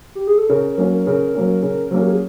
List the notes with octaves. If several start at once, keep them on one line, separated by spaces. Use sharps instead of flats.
G4
G#4
A4
C#3 A#4
A#4
F#3 A#3 C#4
A#4
C#3 A#4
F#3 A#3 C#4
C#3
F#3 A#3 C#4
G4
G#4